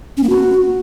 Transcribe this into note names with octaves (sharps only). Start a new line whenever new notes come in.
C#4
A#3
F#4